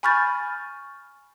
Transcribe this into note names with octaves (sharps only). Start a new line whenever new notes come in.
G#5 B5 C#6 F6 G6 A6